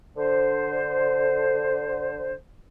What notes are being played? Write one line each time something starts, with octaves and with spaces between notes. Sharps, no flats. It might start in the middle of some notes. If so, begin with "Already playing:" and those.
D3 C5